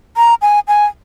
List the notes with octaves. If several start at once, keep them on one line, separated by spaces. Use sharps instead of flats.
A#5
G#5
G#5